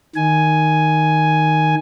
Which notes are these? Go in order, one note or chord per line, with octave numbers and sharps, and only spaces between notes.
D#3 G#5